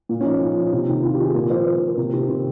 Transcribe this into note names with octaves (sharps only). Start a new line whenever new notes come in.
A#2
C#4
F3 D#4
A#2
F3
C3
D#3
C3 F4
G4
D#3
G#4
A#2 A#4
F3 C5
A#2 C5
F3 A#4
C3
D#3 G4
A#3
C3 C4